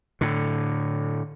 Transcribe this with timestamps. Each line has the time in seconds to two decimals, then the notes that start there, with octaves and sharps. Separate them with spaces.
0.21 A2 D3